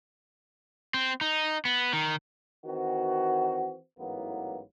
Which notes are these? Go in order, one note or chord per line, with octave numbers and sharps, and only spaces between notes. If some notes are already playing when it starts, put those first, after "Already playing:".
C4
D#4
B3
D#3
D#3 E3 C4 F#4
A1 G#2 E3 F#3 A#3 B3